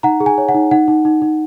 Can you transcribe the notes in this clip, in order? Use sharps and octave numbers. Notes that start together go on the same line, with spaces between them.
D#4 F#5 A#5
G#4
G#5
C#5
F#5
D#4
D#4 F#5
D#4
D#4
D#4